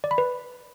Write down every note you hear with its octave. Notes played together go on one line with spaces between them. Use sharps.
D5
B5
B4